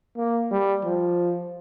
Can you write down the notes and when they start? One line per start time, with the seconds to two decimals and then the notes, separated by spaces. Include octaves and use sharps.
0.17 A#3
0.51 G3
0.85 F3